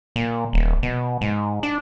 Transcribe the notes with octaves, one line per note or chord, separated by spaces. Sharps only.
A#2
D#1
B2
G#2
D4